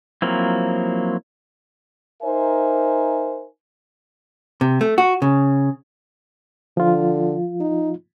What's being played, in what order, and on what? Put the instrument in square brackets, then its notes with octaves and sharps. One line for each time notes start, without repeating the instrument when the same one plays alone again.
[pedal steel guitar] F3 F#3 A#3 C4 E4
[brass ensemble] D#4 A#4 C5 E5 G#5
[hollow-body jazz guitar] C3
A3
F#4
C#3
[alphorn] D3 [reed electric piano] F3 F4
[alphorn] D#4